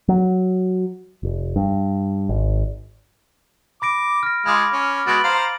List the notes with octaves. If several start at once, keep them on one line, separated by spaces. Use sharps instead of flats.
F#3
F1
G2
G#1
B5 D6 A#6 D7
F6 A#6
G#3 F4 B5 D6
C#4
G#3 B3 F#4 A6 D7 F#7
C5 F5 A#5